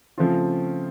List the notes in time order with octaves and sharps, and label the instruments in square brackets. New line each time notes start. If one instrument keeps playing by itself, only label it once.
[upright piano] C#3 F3 A3 C4 F4